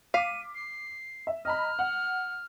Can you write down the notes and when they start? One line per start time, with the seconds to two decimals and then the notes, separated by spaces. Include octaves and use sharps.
0.14 F5 D6 B6 D#7
0.55 C7
1.27 E5
1.45 D#5 A#5 B5 F6
1.79 F#5